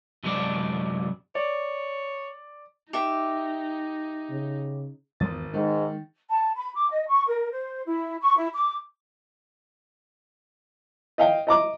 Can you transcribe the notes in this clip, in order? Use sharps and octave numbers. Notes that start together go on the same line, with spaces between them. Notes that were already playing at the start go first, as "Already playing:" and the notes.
F#2 C3 G#3 D4 D5
C#5 D5
D#4 G4 E5
C#3
G#1 E2 D#6 A6
G#2 D#3 G#3
A5
B5
D6
D#5
C#6
A#4
C5
E4
C#6
E4
D6
D#5 F5 G5
D#5 A#5 D6